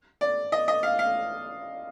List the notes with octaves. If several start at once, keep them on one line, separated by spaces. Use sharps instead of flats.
D5
D#5
D#5
F5
F5